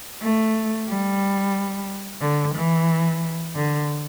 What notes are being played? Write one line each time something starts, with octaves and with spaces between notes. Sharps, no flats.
A3
G3
D3
E3
D3